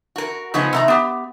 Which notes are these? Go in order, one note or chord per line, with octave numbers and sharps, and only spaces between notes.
F#4 A#4
C#3 F3 G#3 B3 D#4
C3 D#3 A#5
B3 G4